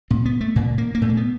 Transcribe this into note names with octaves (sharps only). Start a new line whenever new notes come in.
A#2 C4
B3
A3
A#2 A#3
A#3
A#3
A#2 A3
A#3
B3